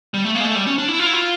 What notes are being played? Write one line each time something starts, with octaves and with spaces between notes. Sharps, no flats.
G3
A3
A#3
G#3
A3
G3
C#4
D4
E4
F4
E4
F4